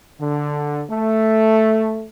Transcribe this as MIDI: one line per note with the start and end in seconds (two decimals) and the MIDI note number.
0.19 0.82 50
0.90 2.05 57